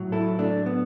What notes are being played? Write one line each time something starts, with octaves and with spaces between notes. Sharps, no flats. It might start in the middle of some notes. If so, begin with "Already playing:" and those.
Already playing: A2 F#3
E4 A4
A3 D4
B3